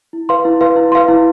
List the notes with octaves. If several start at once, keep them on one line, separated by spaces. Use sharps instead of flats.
E4
B4 F5 C6
E4
B4 F5 C6
E4
B4 F5 C6
E4